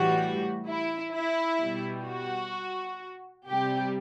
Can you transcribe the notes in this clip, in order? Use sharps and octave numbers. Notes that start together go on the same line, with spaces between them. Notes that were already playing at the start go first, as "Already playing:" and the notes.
Already playing: A2 E3 G3 F#4
E4
E4
B2 G3
F#4
C3 G3 G4